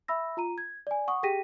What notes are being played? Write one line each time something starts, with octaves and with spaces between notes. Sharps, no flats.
E5 B5 E6 A#6
F4 A#5 D#7
G#6
D5 G#5
F#5 C#6 D#6
G4 G#4 G5 A#6 B6 D#7